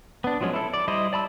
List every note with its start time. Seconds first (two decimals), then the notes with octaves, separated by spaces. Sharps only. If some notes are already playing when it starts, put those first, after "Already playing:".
0.24 B3 D4
0.41 F3 F#3 G#3 C#4
0.53 E4 A4
0.74 D5
0.88 G3 E4 C5 D#5
1.13 D5 A5 B5 E6